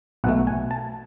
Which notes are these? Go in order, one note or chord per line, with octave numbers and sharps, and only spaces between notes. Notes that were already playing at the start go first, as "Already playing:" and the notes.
B1 B2 A3 F#5
G#5
A5